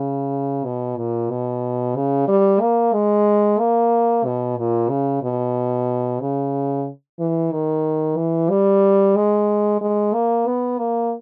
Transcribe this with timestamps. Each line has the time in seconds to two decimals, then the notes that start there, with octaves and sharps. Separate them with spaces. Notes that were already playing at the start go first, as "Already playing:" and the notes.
Already playing: C#3
0.65 B2
0.97 A#2
1.30 B2
1.96 C#3
2.28 G3
2.61 A#3
2.93 G#3
3.59 A#3
4.25 B2
4.57 A#2
4.90 C#3
5.23 B2
6.20 C#3
7.19 E3
7.52 D#3
8.17 E3
8.49 G3
9.16 G#3
9.81 G#3
10.14 A#3
10.46 B3
10.79 A#3